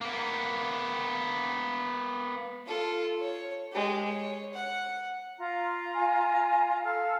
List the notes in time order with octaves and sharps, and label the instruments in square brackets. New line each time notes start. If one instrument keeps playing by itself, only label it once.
[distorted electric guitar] A#3 B3
[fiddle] F4 A4
C#5
G#3 G4
C#5
F#5
[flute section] F4 A#5
[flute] G#5
[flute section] A4 F5